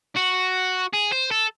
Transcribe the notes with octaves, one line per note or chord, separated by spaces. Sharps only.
F#4
G#4
C5
A4